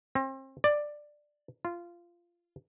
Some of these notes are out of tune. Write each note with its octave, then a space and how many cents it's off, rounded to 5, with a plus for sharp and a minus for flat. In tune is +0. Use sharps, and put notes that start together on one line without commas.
C4 +35
D5 +10
F4 -15